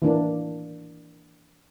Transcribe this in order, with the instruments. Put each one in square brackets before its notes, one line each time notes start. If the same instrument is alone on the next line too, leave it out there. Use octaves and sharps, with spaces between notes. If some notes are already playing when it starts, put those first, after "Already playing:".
[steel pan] E3 A#3 D4